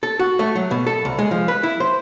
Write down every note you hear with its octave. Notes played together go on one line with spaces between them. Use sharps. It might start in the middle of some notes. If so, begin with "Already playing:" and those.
A4
F#4
A3
F#3
B2
A4
C2
G#3
F3
B4
E4
C5